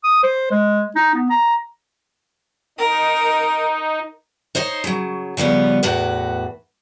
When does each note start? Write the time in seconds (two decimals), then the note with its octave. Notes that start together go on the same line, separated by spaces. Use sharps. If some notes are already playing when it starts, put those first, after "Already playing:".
0.04 D#6
0.23 C5
0.51 G#3
0.96 D#4
1.15 B3
1.30 A#5
2.79 D#4 A#4
4.55 D#4 C5 C#5 D#5
4.84 C#3 F#3
5.37 C#3 F3 G3 B3
5.83 E2 A2 F#4 B4